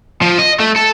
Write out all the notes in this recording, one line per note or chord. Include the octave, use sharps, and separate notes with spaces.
F3
D#5
A3
A4